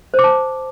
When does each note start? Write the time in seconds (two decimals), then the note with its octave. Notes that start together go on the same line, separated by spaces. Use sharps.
0.14 C5
0.19 D6
0.24 A5